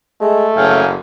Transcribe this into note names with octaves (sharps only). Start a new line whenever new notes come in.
G#3 A3
F#1 C#3 F5 G5 G#5